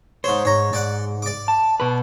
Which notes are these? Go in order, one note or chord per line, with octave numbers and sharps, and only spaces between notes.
G#2 C5 C#5
G#2 C#5 A#5
G#2 D5 F#5
D5 D6
A5
B2 B4